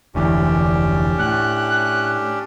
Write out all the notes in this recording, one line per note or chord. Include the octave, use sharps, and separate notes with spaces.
F1 D2 E3 C#4 D4 G4
A2 F#6